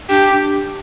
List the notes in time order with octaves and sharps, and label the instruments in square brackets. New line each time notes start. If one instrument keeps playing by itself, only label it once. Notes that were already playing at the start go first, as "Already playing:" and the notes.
[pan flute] D4 [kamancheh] G4